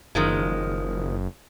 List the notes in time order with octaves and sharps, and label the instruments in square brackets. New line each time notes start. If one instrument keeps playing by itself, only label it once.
[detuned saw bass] F#1 [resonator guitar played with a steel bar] D#3 F3 G#3